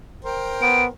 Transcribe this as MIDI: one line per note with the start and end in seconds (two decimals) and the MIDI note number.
0.25 0.88 70
0.25 0.88 72
0.25 0.88 79
0.62 0.87 59
0.62 0.83 98